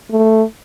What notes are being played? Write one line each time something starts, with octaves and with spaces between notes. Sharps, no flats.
A3